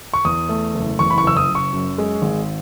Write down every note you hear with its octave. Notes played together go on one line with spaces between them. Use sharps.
C#6
E2 D#6
A3
F#1
E2 C#6
B5
C#6
F#1 E6
D#6
F#1
C#6
F#2
G#3
G#1